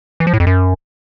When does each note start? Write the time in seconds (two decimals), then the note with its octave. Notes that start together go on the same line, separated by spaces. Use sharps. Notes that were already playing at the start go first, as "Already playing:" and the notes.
0.20 E3
0.27 F3
0.33 A2
0.40 F2
0.47 F#2